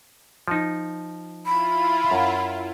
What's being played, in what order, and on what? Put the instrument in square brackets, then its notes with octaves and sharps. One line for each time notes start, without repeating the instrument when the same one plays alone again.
[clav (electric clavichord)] F3 D#4
[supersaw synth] E4 F4 [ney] B5
[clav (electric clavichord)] F#2